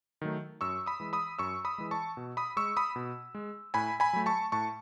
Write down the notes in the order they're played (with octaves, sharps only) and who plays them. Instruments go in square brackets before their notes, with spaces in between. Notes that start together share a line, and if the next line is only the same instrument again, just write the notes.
[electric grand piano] D#3 F#3 A3
F#2 C#6 E6
B5 D#6
E3 G#3
B5 D#6
F#2 C#6 E6
B5 D#6
E3 G#3
A5 C#6
B2
B5 D#6
G#3 C#6 E6
B5 D#6
B2
G#3
A2 G#5 B5
G#5 B5
F#3 A3
A5 C#6
A2 A5 C#6